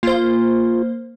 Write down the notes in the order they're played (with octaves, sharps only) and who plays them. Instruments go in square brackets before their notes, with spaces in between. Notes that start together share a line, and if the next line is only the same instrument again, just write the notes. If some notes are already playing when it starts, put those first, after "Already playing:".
[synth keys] A#3 C5 [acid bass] F4